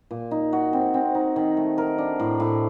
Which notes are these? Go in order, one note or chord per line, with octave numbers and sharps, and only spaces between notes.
A#2
D#4
F#4
C4
C4
D#4
D#3
A3
A#4
D4
A2
A2